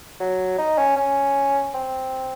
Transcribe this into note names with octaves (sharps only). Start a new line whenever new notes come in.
F#3
D#4
C#4
C#4
C4